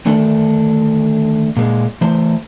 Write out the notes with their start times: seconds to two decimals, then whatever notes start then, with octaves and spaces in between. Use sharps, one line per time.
0.06 D3 D#3 A3 D4 A4
1.57 A#2 G#3
2.01 E3 A3 C5